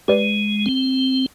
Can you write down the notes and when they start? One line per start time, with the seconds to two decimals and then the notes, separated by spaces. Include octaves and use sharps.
0.08 G#3 G4 B4 D5
0.66 C4